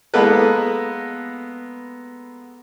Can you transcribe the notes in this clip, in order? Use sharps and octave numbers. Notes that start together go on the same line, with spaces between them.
G#3 A#3 B3 A4 B4